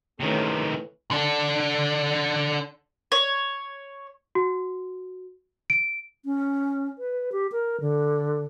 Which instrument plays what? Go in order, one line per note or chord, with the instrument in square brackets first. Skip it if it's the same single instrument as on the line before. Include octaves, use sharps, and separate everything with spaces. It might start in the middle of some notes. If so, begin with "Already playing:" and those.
[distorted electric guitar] C3 D#3 [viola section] E3 A3 C#4
[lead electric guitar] D3 D4
[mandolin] C#5
[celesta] F#4
D7
[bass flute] C#4
B4
G4
A#4
D3